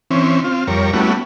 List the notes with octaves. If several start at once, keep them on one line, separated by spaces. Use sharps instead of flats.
E3 C4 C#4
C4 F4
F2 G3 A#4 C#5
G3 A3 B3 C#4 E4 F#4